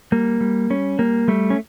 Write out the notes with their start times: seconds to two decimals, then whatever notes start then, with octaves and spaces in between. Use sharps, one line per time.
0.12 G3 A#3
0.41 G3
0.70 G3 C#4
0.99 G3 A#3
1.28 G3 A3
1.50 C#4